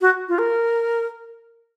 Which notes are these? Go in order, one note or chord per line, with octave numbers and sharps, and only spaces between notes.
F#4
F4
A#4